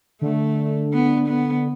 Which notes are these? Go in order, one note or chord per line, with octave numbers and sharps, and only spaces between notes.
D3 A3
B3
B3